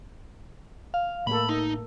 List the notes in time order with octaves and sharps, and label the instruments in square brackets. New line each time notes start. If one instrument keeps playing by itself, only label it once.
[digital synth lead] F5
[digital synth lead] A2 [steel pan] A3 A#3 A4 [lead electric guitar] B5
[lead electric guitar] D#4